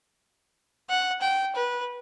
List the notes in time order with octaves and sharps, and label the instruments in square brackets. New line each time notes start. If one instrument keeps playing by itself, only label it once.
[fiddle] F#5
G5
B4